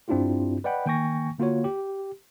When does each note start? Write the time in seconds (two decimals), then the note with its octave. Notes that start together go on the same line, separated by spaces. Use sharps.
0.08 G2 C4 D4 E4 F4 G4
0.64 B4 D5 D#5 F#5 G5 B5
0.86 D#3 A#3 G5 G#5 C#6 A#6
1.38 D3 A#3 F4 F#4 C#5
1.64 G4